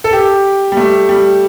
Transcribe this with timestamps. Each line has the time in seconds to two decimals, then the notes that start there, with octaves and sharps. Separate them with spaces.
0.04 A4
0.13 G4
0.72 G3
0.77 A3
1.09 G3